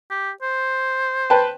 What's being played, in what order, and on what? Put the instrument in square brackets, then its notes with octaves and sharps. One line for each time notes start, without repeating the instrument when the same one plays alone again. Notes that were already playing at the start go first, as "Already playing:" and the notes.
[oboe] G4
C5
[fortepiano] B4 G5 A5